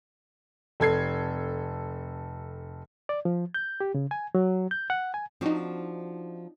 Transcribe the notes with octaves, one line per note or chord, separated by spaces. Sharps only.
F1 A4 G#6 C7
D5
F3
G6
G4
C#3
G#5
F#3
G6
F#5
G#5
F3 C4 D4 D#4 F#4